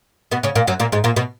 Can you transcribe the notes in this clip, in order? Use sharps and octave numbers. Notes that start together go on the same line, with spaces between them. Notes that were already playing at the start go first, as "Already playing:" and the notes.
B2 B3
C#3 C#4
A#2 A#3
F#2 F#3
A#2 A#3
G#2 G#3
A#2 A#3
B2 B3